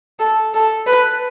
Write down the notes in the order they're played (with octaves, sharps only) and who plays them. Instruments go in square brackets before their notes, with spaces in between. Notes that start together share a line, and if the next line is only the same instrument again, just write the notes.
[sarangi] A4
A4
B4